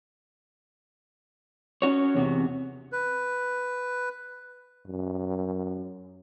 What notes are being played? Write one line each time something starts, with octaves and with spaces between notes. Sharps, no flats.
C#4 F#4 C#5
E2 C3 F#4
B4
F#2